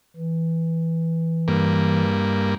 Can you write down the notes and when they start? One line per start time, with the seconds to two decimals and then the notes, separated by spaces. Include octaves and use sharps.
0.16 E3
1.48 G2 A#3